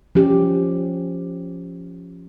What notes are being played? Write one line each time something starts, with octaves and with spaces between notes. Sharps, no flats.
F3 C#4 G4